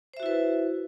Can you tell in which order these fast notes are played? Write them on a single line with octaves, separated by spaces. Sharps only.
C5 E5 F#4 E4 B4